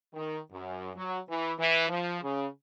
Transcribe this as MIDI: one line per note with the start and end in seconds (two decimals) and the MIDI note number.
0.14 0.37 51
0.51 0.90 42
0.95 1.18 54
1.29 1.52 52
1.58 1.87 52
1.89 2.19 53
2.22 2.46 49